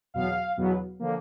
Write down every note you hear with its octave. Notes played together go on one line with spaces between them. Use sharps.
E2 B2 F#3 B3 F5
E2 B2 F#3 B3
D3 F3 A#3